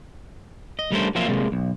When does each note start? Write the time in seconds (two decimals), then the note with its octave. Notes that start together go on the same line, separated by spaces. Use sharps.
0.79 D#5
0.92 G3 A3 C#4 D4 A#4 C5
1.15 F3 F#3 A#3 C4 F4 E5
1.28 C3 G3 G#3 A#3
1.52 B1